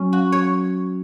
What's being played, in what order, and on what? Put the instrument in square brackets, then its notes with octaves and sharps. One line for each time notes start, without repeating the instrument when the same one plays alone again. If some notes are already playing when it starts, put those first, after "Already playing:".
Already playing: [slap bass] F#3 [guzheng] C#4
[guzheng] F#4
C#5